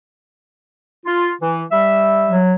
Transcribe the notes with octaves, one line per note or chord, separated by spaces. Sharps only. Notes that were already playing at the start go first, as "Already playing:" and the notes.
F4
E3
G3 E5
F#3